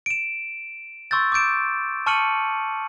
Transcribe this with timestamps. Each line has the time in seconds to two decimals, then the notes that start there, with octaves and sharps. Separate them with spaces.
0.06 D7 E7
1.11 C6 C#6 E6 G6 A6
1.32 D6 E6 G6 D7 E7
2.06 A5 C#6 F6 C#7 D#7 F#7